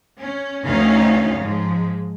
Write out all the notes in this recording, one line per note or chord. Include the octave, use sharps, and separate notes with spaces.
C#4
D2 D#3 C#4 D#4 F5
G#2 F3 G#3